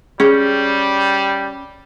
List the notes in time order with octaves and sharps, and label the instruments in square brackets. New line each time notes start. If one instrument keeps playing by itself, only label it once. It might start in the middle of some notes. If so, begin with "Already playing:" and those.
[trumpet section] G3 [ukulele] C#4 [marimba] G#4